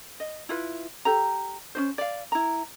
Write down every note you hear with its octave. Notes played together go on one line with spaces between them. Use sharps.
D#5
E4 F4 B4
G4 A4 A#5
C#4 D#4 C5
D5 F5
E4 A#5